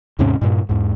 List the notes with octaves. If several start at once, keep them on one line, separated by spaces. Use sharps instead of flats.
D#2 G#2 C3 C#4
G2 A#2
E2 G#2